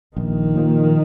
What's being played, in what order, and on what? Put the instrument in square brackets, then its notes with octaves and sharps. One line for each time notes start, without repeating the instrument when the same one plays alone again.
[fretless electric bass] A#1 [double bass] D#3
[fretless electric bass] A#2 F3 A#3